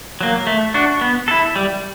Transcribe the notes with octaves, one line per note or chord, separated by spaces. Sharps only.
F#3 A#3
A3
D4 F#4
B3
E4 A4
G3